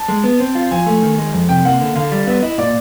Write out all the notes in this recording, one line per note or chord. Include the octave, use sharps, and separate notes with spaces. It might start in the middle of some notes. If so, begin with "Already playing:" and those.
Already playing: A5
G#3
B3
C4
F4
F3 G#5
A3
D#3
G#3
F2
C3 G5
A#3 F#5
D3
D3 F5
G3
B3 E5
E4 D#5
A#2 D5